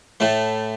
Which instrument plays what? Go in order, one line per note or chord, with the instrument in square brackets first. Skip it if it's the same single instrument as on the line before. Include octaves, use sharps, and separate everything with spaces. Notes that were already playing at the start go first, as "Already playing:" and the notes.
[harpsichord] A2 A3